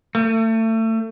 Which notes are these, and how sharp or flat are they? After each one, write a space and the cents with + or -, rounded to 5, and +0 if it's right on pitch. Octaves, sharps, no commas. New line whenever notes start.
A3 +30